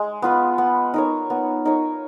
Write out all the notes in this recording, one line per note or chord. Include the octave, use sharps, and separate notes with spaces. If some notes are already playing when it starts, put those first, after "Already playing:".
Already playing: G#3
B3 F4 B4
B3
D#4 A#4 C#5
B3
D#4 A#4 C#5